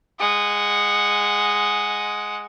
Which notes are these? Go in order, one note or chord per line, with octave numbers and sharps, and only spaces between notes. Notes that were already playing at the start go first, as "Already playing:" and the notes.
G#3 F#5